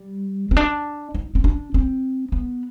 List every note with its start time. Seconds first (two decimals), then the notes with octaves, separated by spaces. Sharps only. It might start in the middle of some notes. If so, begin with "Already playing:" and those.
Already playing: G3
0.51 C4
0.57 D4
1.15 D#4
1.35 C4
1.44 D4
1.74 C4
2.32 B3